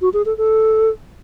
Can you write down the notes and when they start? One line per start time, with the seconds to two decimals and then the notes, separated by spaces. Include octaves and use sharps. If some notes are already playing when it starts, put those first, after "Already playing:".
0.02 F#4
0.14 G#4
0.26 A4
0.38 A4